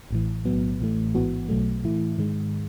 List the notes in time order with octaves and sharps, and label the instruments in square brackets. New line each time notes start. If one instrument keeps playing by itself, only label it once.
[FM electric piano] A1 A2 E3
B1 A2 F#3 B3
A1 A2 E3 A3
A1 G#2 E3 B3 F#4
B1 B2 F#3 A3
A2 E3 A3 E4
G#2 D#3 G#3